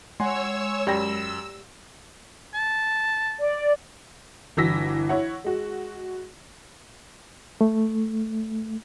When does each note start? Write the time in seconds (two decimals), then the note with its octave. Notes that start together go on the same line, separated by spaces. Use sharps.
0.20 G#3 C#5 F#5 G#5 C6 E6
0.87 F#2 G4 D5 G5 B5 E6 A#6
2.54 A5
3.40 D5
4.57 G1 E3 F#4 E6 A#6 B6
5.09 E4 C#5 F#5
5.44 G#3 F#4
7.61 A3